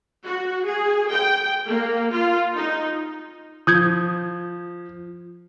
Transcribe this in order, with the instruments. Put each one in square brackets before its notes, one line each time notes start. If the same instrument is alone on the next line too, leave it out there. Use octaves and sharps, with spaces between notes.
[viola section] F#4
G#4
G5
A#3
F4
D#4
[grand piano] F3 [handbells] D#6 G6 G#6